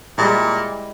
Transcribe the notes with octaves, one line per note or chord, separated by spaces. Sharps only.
A#2 G3 G#3 E4